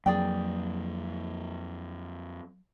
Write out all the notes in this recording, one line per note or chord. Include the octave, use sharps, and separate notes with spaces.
F2 F#3 A#3 G#4 D5 G5